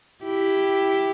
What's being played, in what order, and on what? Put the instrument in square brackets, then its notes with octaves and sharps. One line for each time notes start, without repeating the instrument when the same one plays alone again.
[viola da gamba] E4 G4